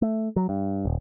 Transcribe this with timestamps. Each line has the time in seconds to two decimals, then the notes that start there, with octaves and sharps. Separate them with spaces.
0.02 A3
0.36 F#3
0.49 G2
0.85 D#1